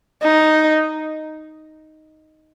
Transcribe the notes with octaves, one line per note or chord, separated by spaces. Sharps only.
D#4